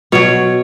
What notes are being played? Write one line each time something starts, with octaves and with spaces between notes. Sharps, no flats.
B2 F#3 C#5